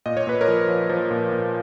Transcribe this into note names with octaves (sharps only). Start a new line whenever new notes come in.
A#2 D#5
C#5
A#2 B4
A#4 C#5
F3
F3
F3
A#2
A#2